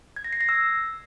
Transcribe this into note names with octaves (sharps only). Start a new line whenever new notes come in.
G#6
A#6
C7
A#6
E6